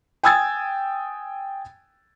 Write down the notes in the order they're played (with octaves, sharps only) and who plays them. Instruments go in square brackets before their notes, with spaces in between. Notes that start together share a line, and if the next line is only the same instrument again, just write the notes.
[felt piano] G5 G#5 D#6 E6 G#6 A6